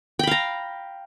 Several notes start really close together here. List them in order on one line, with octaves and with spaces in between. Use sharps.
G5 B5 F5 A#5